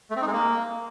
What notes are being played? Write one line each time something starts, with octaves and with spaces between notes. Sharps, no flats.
A3
C4
D#4
G#3
A#3